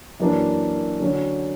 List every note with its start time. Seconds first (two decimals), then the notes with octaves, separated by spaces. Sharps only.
0.20 F#2 E3 A#3 D4
1.00 D3 F#3 C#4